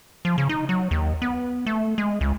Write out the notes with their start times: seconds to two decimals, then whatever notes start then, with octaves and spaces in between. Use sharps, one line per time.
0.25 F3
0.38 C#3
0.49 D#4
0.69 F#3
0.91 D#2
1.22 B3
1.66 A3
1.98 G#3
2.21 C#2